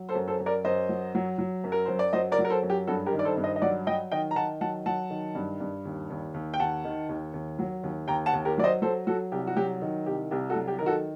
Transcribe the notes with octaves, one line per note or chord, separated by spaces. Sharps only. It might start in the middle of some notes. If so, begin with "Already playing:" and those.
Already playing: F#3
A4 C5
F#2
A4 C5
F#2
A#4 D5
F#2 C5 D#5
F#3
F#3
F#3
F#2
A#4
F#2 C5
D5
F#3 C5 D#5
A#4 D5
F#3
A#4
A4 C5
F#2
G4
G2 F#4 A4
G4 A#4
D#3
D5
A4 C5
G2
C5 D#5
D#5
F#3 D5 F#5
F#3 D#5 G5
D#3 D#5 G5
A#5
D#3 F#5 A5
F#3 F#5 A5
F#3 F#5 A5
D#3
G2
G2
D#2
D#2
D#2
G5
D#2 F#5 A5
D#3
D#2
D#2
F#3
D#2
D#2 G5 A#5
F#5 A5
D#2
G4 A#4
F#3 D5
C5 D#5
F#3 A4 C5
F#3 F#4 A4
C2 G4
F#4
F#3 G4
D#3
C2 G4
C2 G4
F#4 A4
F#3
G4
D#3 A#4
F#4 A4